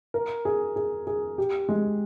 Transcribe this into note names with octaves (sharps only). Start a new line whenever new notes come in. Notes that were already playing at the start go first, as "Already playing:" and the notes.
A#4
G#4
G#4
G#4
G4
G#3